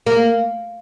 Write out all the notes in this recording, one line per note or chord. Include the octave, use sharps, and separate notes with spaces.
A#3